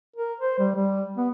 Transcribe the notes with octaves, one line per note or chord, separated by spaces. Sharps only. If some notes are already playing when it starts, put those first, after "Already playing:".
A#4
C5
G3
G3
B3